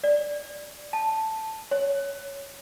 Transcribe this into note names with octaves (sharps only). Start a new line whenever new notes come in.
D5
A5
C#5